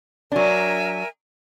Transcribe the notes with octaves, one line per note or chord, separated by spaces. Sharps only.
F#3 D4 A#4 E5 G#5